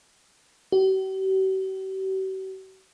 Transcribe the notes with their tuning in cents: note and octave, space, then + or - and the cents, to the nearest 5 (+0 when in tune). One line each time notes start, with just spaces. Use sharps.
G4 -45